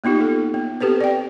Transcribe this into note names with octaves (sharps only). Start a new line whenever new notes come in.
A#3 B3 D#4 F4 G4
A4
B3
C4 G4 A4 B4 C5
D5 G5